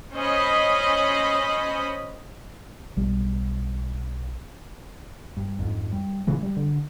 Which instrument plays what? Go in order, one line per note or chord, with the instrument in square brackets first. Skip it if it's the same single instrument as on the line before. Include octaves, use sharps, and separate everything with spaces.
[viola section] C#4 C5 D#5 B5
[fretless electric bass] B1 G3
[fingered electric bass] G2
F2 G#2
G3
A#2 C#3 E3 G#3
G3
D3